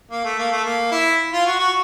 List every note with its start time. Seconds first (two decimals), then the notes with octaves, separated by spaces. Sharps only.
0.11 A#3
0.24 A3
0.38 A#3
0.52 A3
0.65 A#3
0.91 E4
1.33 F4
1.46 F#4
1.59 F#4